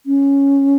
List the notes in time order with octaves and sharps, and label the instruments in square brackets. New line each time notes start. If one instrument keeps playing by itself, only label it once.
[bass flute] C#4